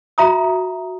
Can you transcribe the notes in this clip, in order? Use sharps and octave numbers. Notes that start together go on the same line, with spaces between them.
F4 F#4 E5 A#5 D#6